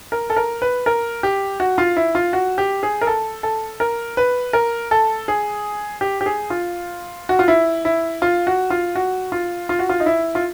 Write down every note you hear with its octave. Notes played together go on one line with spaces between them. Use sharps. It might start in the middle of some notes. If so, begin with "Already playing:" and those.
A#4
A4
A#4
B4
A#4
G4
F#4
F4
E4
F4
F#4
G4
G#4
A#4
A4
A4
A#4
B4
A#4
A4
G#4
G4
G4
G#4
F4
F#4
F4
E4
E4
F4
F#4
F4
F#4
F4
F4
F#4
F4
D#4
E4
F4